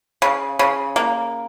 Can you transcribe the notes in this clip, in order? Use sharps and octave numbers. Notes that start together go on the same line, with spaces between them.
C#3
C#3
A#3